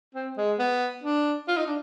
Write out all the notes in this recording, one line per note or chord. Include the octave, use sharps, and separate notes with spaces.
C4
G#3
B3
D4
F4
D#4
D4